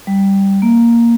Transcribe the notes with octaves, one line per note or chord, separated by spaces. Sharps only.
G3
A#3